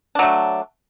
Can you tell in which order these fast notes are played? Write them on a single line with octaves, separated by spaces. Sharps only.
D4 F#3 A3